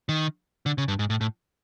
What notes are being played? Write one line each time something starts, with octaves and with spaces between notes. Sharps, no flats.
D#3
D3
C#3
G2
G#2
A2
A2